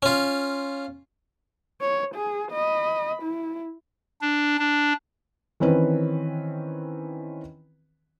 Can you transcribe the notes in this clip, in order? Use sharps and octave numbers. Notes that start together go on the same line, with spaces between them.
C#4 F4
C#5
G#4
D#5 B5
E4
D4
D4
D#3 E3 C4 C#4 B4